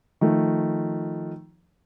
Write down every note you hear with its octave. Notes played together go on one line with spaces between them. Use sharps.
D#3 F3 A3